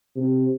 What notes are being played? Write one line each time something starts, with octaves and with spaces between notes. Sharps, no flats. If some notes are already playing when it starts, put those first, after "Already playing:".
C3